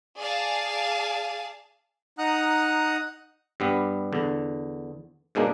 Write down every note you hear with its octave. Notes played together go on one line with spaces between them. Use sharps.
G#4 D5 F5 G#5 A5
D#4 F#5 A#5 D#6 F#6
G2 G3 B3
E2 D3
G#2 B2 G#3 A#3 D4